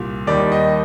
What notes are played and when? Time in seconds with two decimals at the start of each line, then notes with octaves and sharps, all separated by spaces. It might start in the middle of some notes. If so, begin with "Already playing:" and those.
Already playing: C2 A#2
0.27 D#2 D#3 G3 D5
0.52 D#5